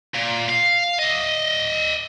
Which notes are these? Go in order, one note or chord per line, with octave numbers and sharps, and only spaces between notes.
A#2
F5
D#5 E5